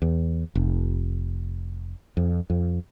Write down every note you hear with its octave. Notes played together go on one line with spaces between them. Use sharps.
E2
F1
F2
F2